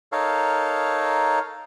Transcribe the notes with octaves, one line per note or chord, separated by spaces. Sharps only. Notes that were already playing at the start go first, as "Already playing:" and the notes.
D#4 A4 A#4 C#5 F5